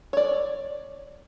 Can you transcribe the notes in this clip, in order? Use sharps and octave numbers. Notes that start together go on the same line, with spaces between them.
C#5 D5